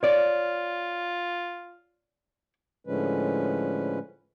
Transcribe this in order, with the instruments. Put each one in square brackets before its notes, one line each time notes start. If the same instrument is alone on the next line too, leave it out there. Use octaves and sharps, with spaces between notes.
[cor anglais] F4 [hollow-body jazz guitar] C#5 D5
[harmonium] A2 D3 F3 G#3 C#4 B4